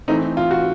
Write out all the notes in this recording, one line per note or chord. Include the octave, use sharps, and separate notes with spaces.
E3 A3 C4 D#4
F4
F#4